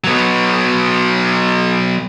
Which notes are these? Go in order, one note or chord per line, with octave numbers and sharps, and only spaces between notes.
F#3 B3